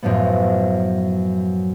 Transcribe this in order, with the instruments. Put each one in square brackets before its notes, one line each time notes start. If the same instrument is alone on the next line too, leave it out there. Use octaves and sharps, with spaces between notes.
[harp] F#2 A2 F3 A3 B3